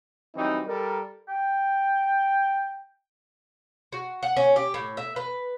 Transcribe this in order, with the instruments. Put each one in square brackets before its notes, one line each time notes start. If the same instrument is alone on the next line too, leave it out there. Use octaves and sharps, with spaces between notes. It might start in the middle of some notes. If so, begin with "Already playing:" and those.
[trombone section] E3 F#3 G3 C4 D#4
G3 A4 A#4
[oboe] G5
[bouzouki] F#4
F#5
C#4
G4
A2
E5
B4